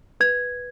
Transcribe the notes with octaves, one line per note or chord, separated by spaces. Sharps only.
B4 G#6